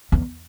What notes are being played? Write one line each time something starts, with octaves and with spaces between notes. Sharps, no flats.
E2